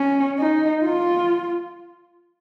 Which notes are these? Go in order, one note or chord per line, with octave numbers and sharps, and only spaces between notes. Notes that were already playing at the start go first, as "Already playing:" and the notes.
Already playing: C#4
D#4
F4